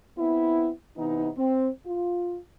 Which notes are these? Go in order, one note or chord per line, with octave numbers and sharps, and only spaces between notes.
B3 C4 E4
C3 E3 B3 D#4
C4
F4